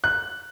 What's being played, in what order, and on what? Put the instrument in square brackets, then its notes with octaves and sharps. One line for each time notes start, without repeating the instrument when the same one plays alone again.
[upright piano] F#6